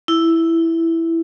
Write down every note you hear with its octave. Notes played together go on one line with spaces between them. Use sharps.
E4